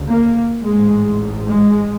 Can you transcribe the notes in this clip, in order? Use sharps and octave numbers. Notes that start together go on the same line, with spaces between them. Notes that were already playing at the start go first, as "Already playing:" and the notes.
Already playing: D2 C#3
A#3
A1 G#2 G#3
G#3